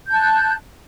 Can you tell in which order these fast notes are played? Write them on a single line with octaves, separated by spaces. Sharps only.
G6 A5 F#6